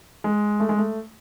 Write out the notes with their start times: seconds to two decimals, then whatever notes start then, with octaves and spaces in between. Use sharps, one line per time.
0.24 G#3
0.60 A3
0.69 G#3
0.78 A3